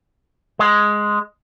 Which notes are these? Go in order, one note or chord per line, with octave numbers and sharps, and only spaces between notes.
G#3